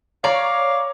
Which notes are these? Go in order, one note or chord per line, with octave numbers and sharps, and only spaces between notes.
C#5 D5 F5 A#5 C#6